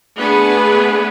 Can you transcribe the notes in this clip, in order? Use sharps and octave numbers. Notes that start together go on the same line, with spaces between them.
A3 B3 D4 G#4 B4